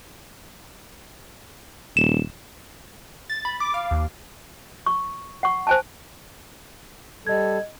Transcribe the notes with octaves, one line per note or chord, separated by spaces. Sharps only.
D#1 E7
A6
B5
D6
F5
D#2
C#6
F#5 C#6
C5 G#5 A5
G3 A4 D#5 G#6